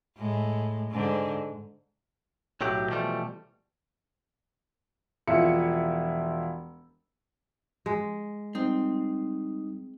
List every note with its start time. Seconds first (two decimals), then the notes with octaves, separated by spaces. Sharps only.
0.17 A2 G#3
0.91 G#2 D3
2.61 B1 A2 F#3 G4
2.90 B2 E3 F3 G3 A3
5.27 E1 F3 E4 C#7
7.86 G#3
8.55 G3 C4 D#4 D#6